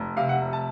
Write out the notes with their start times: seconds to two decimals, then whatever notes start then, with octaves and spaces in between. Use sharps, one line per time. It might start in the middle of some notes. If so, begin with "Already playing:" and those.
Already playing: F1
0.17 C3 F5
0.29 F#5
0.41 F1
0.53 A5